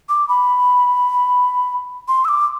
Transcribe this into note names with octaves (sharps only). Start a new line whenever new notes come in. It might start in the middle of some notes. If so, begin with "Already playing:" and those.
D6
B5
C6
E6
D6